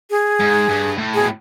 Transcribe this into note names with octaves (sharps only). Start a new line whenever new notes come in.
G#4
G#2
G2
A2
B2 G#4